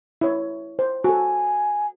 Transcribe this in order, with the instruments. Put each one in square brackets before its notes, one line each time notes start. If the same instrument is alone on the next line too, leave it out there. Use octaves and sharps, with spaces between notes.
[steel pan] E4 C#5
C5
[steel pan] F#4 A4 [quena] G#5